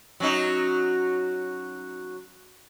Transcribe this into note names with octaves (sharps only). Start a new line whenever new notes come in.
F#3 C#4 D#4